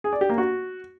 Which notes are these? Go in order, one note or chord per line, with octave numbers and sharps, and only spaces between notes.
G#4
D5
G4
A#3
F#4